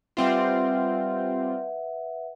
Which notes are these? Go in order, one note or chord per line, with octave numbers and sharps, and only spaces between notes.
G3 C4 F4 B4 E5 F#5